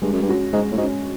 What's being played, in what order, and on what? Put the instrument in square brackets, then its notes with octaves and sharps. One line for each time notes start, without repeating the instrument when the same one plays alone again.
[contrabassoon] G2 [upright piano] G#3
[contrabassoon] F#2
G2
[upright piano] C#4 F#4
[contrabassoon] G#2 [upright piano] G#3
[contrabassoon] A2
[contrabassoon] G#2 [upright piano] C#4 F#4